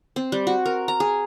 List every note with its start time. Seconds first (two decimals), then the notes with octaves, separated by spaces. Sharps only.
0.16 C4
0.32 G3
0.47 F#4
0.66 A#4
0.88 A#5
1.00 G#4